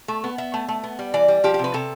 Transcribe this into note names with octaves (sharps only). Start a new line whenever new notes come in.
A3
B3
B3 E5
A3
A3
B3
G3
E3 D5
G3
F3 G4
G4
C3
B4
C3 A4